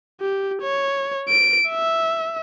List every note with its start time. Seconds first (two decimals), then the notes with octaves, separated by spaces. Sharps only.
0.21 G4
0.62 C#5
1.29 D7
1.69 E5